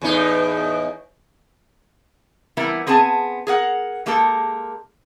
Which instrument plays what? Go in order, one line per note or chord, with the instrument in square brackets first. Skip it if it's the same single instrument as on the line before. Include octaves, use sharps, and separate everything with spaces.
[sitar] E2 A2 D#4
[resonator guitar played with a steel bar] E3 G3 B3 C4 E4 A#4
B3 C4 G#4 G#5 A5
G#4 A#4 F#5
G#3 A#3 G4 A4 A#4